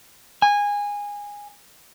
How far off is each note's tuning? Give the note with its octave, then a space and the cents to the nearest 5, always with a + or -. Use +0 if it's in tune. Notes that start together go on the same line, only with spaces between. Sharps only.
G#5 -20